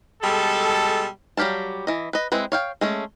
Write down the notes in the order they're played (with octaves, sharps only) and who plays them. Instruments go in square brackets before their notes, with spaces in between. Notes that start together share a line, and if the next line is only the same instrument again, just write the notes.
[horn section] B2 G3 G#3 A4
[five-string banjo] F#3 G3 G4 F5 A5
E3 D#5
B4 D#5
G#3 C4 E4 B4
C#5 F5 G5
G#3 A3 C#4